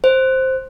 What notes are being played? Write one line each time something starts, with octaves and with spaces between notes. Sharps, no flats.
C5